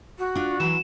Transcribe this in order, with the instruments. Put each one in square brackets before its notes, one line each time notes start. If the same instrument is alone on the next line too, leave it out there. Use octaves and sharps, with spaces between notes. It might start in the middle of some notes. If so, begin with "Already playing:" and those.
[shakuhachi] F#4
[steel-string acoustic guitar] D4 F4
[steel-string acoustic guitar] E3 F#3 [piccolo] E7